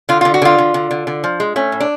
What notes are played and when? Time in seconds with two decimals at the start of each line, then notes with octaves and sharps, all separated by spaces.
0.09 D3 F4
0.21 D3 F4
0.34 F#4
0.42 D3 F4
0.58 D3
0.74 D3
0.91 D3
1.07 D3
1.24 F3
1.40 G#3
1.56 A3 C#4
1.72 A2
1.80 D4